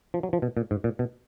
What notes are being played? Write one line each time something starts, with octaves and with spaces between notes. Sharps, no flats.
F3
F#3
F3
B2
A#2
G#2
A#2
B2